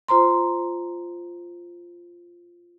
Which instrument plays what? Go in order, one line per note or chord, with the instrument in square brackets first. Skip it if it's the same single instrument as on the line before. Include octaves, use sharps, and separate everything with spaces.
[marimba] F4 C5 A#5 C6